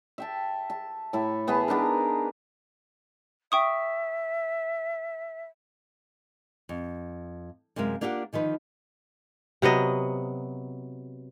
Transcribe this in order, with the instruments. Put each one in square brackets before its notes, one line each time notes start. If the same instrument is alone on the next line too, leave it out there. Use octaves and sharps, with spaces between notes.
[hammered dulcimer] E5 G5 A5
A5
A2 E4 A4
E3 B3 G#4 A5
B3 D4 D#4 A#4
[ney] E5 [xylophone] G5 C#6 D#6
[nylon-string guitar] F2
F#2 C3 G#3 A#4 F5
A#3 D4 F4 G4 F5 F#5
D3 D#3 F3 B4
[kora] C3 F#3 B3 D#5